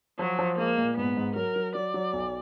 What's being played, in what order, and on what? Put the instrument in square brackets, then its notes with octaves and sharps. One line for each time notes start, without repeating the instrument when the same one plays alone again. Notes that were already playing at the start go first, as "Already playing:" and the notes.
[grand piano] F3 [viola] F#3
[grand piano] F3
[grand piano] G#3 [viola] A#3
[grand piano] A#2
[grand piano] G#2 [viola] B3
[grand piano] G#2
[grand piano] F#3 [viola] A#4
[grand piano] F#3
[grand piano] F#3 [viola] D5
[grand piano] F#3
B1